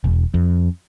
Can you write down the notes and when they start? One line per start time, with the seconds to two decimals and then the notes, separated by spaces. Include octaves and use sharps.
0.04 E1
0.34 F2